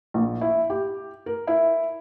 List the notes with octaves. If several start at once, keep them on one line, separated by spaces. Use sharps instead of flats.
A#1
E4
G4
A#4
E4